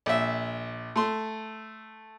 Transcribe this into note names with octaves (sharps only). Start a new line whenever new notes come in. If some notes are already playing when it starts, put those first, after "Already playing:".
A#1 E5
A3 C6